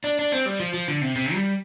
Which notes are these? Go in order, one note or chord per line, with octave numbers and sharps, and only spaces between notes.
D4
D4
C4
G3
F3
F3
D3
C3
C3
G3